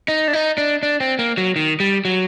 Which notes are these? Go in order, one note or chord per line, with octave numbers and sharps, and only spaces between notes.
D#4
D4
D#4
D4
D4
C4
A#3
F#3
D#3
G3
F#3